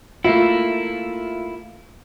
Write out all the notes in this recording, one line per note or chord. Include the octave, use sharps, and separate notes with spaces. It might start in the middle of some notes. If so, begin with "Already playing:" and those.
A3 A#3 E4 F4